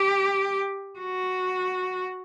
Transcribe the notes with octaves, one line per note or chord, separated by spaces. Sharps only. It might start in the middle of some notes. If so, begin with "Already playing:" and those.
Already playing: G4
F#4